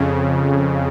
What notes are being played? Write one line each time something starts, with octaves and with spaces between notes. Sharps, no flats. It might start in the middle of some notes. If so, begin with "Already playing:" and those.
Already playing: F2 C#3